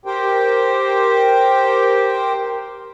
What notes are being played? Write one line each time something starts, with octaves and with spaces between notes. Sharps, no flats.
G4 A#4 C5 G5